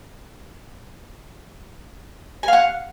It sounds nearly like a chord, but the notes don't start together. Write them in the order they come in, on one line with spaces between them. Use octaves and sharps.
G#5 F5 F#5